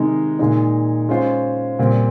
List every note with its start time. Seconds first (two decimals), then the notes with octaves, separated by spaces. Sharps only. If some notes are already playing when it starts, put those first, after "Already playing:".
Already playing: C3 D#3 G#3 D#4
0.39 A#2 G#3 D#4
1.09 G#3 C#4 F4 C5
1.79 A#2 G3 C4